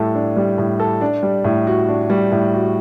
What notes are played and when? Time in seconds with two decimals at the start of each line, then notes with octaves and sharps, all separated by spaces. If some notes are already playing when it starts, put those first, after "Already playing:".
Already playing: A2 G3 A4
0.15 D4
0.36 G3
0.58 A2
0.80 A4
1.01 D4
1.23 G3
1.45 A2
1.67 F#4
1.88 D4
2.10 G3
2.32 A2
2.54 F#4